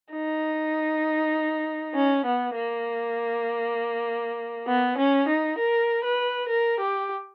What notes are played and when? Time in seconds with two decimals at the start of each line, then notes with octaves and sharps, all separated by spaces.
0.13 D#4
1.94 C#4
2.25 B3
2.55 A#3
4.67 B3
4.97 C#4
5.28 D#4
5.58 A#4
6.04 B4
6.49 A#4
6.80 G4